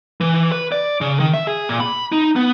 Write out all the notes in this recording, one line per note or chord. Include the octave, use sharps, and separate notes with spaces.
E3
B4
D5
C#3
D#3
E5
G#4
A#2
B5
D#4
B3